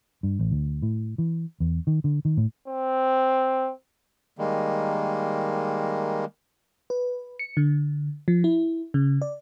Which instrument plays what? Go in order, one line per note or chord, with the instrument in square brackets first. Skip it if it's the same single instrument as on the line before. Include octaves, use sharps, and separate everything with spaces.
[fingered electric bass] G2
A1
D2
A2
E3
E2
D#3
D3
D#3
A2
[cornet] C4
[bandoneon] D#3 G3 G#3 A#3
[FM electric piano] B4
C#7
D3
F3
E4
C#3
D5